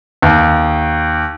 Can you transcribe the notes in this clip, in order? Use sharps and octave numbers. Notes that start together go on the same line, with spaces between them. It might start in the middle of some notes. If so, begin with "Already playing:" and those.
D#2